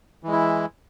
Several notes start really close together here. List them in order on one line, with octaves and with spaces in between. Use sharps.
E3 G#3 E4